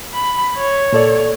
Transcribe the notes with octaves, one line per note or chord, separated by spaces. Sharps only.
B5
C#5
A#2 A4 D5